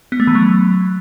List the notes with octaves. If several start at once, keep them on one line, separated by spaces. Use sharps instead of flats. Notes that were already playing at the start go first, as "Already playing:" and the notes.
B3
A3
E3
F#3